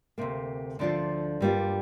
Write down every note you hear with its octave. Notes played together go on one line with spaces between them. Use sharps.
D2 C3 A#3
D2 D3 F3 D4 F4
G2 G3 A#3 D4 F4